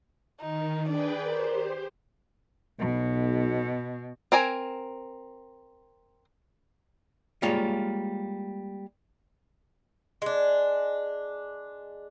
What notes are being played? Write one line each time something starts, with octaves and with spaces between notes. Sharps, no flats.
D#3 D#4
D4 G#4 B4 D5 G5
G4 A#4 C5
B1 B2
C4 A#4 G#5 A#5
G3 G#3 A#3 F4 C#5
G#3 D4